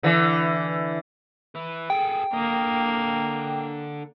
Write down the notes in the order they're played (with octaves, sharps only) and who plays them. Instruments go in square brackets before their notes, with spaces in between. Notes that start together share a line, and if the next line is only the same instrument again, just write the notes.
[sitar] D3 E3
[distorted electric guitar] B4 E5
[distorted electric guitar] G#4 A4 [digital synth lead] G5
[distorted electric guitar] D3 D#5 [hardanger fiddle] A#3